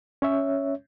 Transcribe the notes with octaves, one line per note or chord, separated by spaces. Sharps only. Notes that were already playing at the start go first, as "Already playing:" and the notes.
C#4 C#5 E5